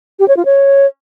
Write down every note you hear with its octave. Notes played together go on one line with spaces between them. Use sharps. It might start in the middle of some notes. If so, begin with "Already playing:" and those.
G4
C#5
F4
C#5